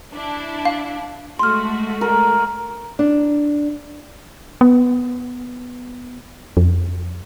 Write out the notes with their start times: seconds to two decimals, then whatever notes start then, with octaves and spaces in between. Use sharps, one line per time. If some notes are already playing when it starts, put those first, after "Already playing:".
0.12 D4 E4
0.65 F5
1.39 G#3 A3 F#4 C6 F6
2.01 A#4
2.99 D4
4.61 B3
6.57 F2